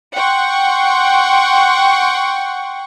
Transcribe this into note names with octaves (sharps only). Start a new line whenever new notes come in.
F#5 G5 C6 C#6